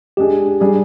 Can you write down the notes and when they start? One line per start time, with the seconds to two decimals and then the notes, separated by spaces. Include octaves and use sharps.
0.17 G#3 D4 G4 G#4
0.60 G3 D4 G#4